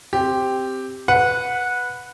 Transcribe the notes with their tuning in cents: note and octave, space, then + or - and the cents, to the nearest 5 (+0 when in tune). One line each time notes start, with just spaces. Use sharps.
C4 +0 G4 +0
B4 +5 F#5 -15